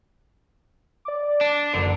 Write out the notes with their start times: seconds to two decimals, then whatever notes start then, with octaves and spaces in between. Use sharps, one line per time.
1.05 D5 D6
1.41 D4
1.73 F#1 D3 F#3